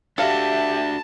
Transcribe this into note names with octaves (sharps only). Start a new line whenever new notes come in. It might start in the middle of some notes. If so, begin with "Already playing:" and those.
D4 F#4 G4 A4 E5 F5 A5